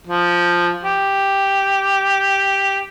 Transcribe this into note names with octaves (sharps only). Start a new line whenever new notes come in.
F3
G4